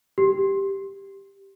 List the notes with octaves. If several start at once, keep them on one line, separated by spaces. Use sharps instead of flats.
G4